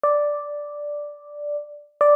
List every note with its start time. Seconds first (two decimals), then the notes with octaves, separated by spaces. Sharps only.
0.03 D5
2.01 D5